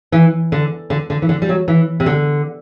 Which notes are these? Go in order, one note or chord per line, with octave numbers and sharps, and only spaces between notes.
E3
D3
D3
D3
E3
D3
G3
F#3
E3
C3
D3